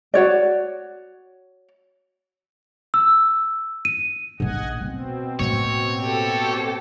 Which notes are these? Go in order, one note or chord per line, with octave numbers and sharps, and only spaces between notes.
F#4 C#5 D5
E6
D#7
A#1 D#3 D#5 F#5 G#5
B2 B3 C4
A2 A#3 C#5
G4 A4